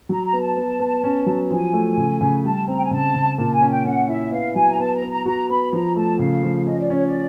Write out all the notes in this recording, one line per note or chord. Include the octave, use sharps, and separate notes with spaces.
F#3 A#5
A#5
B3
A5
B3
B3
C#4
F#3
F3 G#5
A3
C#3
C#3
G3 A5
C4 A#5
G5
G#5
C#3 A5
C#3
A#2 A5
G#5
C#4
G5
C#4 F#5
E4 E5
B3 F5
F#3 G#5
A#5
B3 A5
A#5
B3
A#5
F#4 A#5
B3 B5
F3 A#5
A3 A5
C#3 F5
F3
C#4 D#5
D5
C#4 C#5
D5